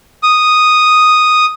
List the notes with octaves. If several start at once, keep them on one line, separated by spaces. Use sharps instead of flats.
D#6